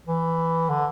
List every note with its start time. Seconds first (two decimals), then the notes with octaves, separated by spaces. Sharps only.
0.08 E3
0.69 D3